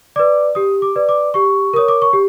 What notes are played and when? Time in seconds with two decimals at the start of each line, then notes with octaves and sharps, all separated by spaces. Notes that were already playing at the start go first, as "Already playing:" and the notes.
0.16 B4 D5 D6
0.55 G4 D#6
0.82 D6
0.96 B4 D5
1.09 D6
1.34 G4 C#6
1.73 A#4 C#5 D#6
1.88 D6
2.02 C#6
2.13 G4